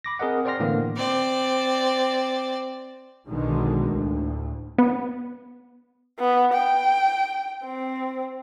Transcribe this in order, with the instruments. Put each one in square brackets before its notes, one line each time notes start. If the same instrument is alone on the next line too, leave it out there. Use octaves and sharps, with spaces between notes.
[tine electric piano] B5 D6 A#6
C4 G#4 A#4 D#5 F#5
C5 D5 G5 C6 F6 A#6
A2 D3 E3 A#3 B3
[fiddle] C4 D5
[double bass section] B1 B2 D3 D#3 G#3
D2 A2
[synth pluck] B3
[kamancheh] B3
G5
C4